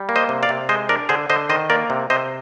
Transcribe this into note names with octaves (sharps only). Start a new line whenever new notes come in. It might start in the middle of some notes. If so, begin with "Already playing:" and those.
Already playing: G3
A#3
C5 D#5
C3
D5 F5
C3
G#3 C5 D#5
D4 A#4 D5
D3 G#4 C5
D3 C5 D#5
D#3 C5 D#5
A#3 A#4 D5
C3
C3 C5 D#5